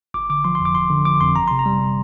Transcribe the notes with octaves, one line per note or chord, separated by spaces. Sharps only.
G1 D6
D3 D6
F3 C6
C6
F2
D6
G1 C6
D3
F3 D6
F2 C6
G1 A#5
C3 C6
A#5
G3